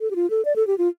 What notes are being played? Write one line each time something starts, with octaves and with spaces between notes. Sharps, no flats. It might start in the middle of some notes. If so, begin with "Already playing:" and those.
A4
G4
F4
A4
D5
A4
G4
F4